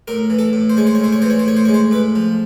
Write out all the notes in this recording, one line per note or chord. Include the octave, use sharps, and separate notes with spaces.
A2 A#4
E3
A4
A2
C5
G#3 C#5
C5
C#5
A2 C5
C#5
E3 C5
C#5
C5
A2 C#5
C5
G#3 C#5
C5
A2 B4
F3